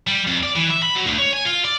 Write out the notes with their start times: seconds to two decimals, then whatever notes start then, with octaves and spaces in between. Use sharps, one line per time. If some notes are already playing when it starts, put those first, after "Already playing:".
0.07 G3
0.27 F2
0.43 D5
0.55 E3
0.70 E5
0.83 B5
0.95 F#3
1.07 D2
1.18 C#5
1.33 G#5
1.45 F4
1.64 D5